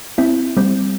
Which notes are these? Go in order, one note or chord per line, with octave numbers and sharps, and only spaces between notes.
C4 E4
G3 C4